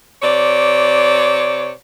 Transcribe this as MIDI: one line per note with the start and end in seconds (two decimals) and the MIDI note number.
0.22 1.70 48
0.22 1.70 73
0.22 1.70 74